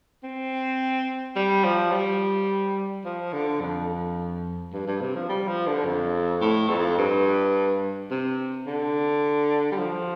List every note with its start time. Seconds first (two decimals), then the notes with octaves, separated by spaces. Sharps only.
0.24 C4
1.36 G3
1.64 F3
1.92 G3
3.05 F3
3.33 D3
3.61 F2
4.73 G2
4.87 G2
5.01 C3
5.15 F3
5.29 G3
5.48 F3
5.67 D3
5.86 F2
6.41 A2
6.69 F2
6.98 G2
8.11 C3
8.67 D3
9.72 G3
9.79 F3